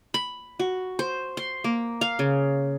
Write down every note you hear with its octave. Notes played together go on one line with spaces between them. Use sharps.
B5
F#4
C5
C6
A#3
F5
C#3